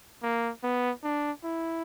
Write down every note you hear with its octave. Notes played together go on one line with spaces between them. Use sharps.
A#3
B3
D4
E4